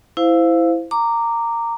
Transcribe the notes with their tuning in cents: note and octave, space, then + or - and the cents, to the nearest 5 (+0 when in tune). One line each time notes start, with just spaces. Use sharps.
E4 +0 C5 -15 F5 +0
A#5 -15 D6 +0